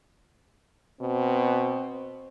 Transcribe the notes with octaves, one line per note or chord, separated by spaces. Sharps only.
B2 C4